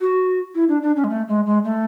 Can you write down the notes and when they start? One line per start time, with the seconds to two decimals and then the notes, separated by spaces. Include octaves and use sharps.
0.01 F#4
0.55 E4
0.69 D4
0.82 D4
0.96 C#4
1.04 G#3
1.09 A3
1.28 G#3
1.46 G#3
1.64 A3